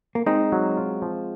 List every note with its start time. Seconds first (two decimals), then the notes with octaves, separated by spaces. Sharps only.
0.15 A#3
0.26 G#3 C4 D#4
0.52 F#3
0.77 F4
1.02 F3